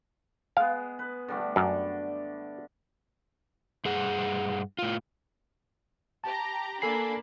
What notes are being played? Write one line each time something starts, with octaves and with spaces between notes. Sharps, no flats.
G#3 B3 F5
B4
D3 G3 A3
F#2 D3
G2 G#4 F#5
A2 F4
G4 A5 A#5
A#3 D4 A4 G#5 B5 C7